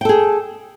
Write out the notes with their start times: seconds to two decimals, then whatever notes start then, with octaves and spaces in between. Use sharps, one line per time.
0.01 G5
0.05 A4
0.09 G#4